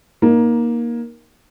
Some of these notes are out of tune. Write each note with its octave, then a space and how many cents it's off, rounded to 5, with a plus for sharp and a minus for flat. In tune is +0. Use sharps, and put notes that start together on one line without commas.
A#3 +15 D#4 +0